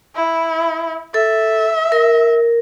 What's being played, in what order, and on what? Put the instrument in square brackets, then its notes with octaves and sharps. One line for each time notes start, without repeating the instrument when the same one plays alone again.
[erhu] E4
[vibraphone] A4 [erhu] E5
[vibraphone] A#4